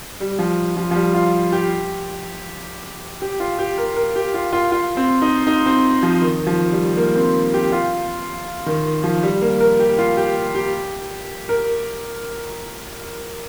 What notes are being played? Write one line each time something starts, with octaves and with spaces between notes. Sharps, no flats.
G3
F3
F3
F3
G3
F4
G4
G4
F4
G4
A#4
A#4
G4
F4
F4
F4
C4
D#4
D#4
C4
F3
D#3
F3
G3
A#3
C4
G4
F4
D#3
F3
G3
A#3
A#4
G4
F4
G4
G4
A#4